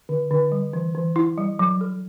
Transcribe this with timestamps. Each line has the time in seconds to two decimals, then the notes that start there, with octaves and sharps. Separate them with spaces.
0.09 D3
0.31 D3
0.52 G3
0.73 E3
0.95 E3
1.16 E4
1.38 G3
1.59 F#3
1.81 A4